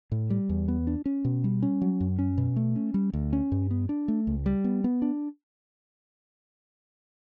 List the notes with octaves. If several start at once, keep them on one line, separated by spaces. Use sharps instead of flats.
A2
G3
E2
B3
D4
C#4
B2
G3
C#4
F#3
F#2
C#4
B2
A3
C#4
G3
D2
C#4
G2
B3
D4
A3
C#2
G3
B3
B3
D4